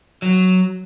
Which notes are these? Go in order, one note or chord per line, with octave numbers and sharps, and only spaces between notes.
F#3